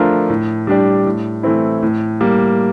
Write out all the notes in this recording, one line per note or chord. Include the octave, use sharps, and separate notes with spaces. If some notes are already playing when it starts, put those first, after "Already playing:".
Already playing: F3 A3 D4 F4 A#4
A2
G3 D4 G4 D5
A2
E3 A3 C4 E4
A2
G3 A#3